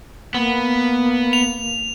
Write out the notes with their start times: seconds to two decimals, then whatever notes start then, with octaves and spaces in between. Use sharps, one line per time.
0.34 A#3 B3
1.33 F7